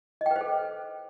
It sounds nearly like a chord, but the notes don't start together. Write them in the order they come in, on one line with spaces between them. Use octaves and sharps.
D#5 G5 B4 C5 A4